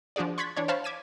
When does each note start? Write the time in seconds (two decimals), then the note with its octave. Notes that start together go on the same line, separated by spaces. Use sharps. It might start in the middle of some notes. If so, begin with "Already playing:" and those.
0.16 F3 D4 F#4 G#4 D5
0.38 C6 C#6 F#6 G#6 A6 B6
0.57 E3 D4 C#5
0.68 C5 C#5 F5 A5 B5
0.84 D6 G#6 B6 D#7 E7